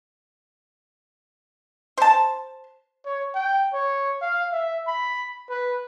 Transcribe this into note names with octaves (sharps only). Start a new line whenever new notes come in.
C5 A5
C#5
G5
C#5
F5
E5
B5
B4